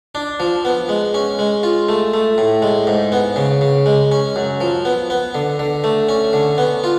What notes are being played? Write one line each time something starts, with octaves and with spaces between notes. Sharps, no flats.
D4
F3
B3
G#3
C#4
G#3
F4
A3
A3
A2
G#3
G#2
B3
C#3
C#3
G#3
C#4
F#2
F3
B3
B3
D3
D3
A3
C#4
D3
B3
F4